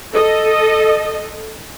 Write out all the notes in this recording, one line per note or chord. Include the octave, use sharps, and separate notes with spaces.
A4 D#5